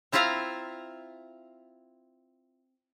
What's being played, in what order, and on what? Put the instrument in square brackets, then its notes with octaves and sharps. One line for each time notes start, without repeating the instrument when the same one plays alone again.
[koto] C4 E4 F4 E5 F5 A#5